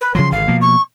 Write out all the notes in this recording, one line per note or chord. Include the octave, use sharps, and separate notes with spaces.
B4
C#3 F3 F#3 C6
G#1 D3 F5
B2 F3 A#3
C#6